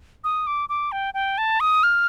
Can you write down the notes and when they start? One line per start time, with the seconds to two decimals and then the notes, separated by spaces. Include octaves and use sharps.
0.24 D#6
0.47 D6
0.69 D6
0.92 G5
1.14 G5
1.38 A5
1.60 D#6
1.83 F6